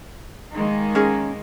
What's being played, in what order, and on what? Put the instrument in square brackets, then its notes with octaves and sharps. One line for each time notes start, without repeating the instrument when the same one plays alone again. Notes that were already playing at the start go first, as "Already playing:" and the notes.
[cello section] D#3 G#3 A#3
[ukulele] C#4 D#4 G#4